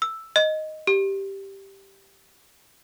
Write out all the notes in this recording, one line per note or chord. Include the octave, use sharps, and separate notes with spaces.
E6
D#5
G4